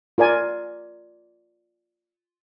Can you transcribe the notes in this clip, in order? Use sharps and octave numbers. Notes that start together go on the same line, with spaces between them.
F4 A#4 D5 G#5